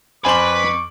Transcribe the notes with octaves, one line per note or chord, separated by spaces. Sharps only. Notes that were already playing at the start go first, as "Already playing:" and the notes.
F2 B4 C5 G#5 C#6 D6 F#7